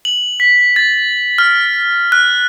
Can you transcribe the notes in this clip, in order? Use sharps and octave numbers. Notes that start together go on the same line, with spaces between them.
F#7
B6
A6
F6
F#6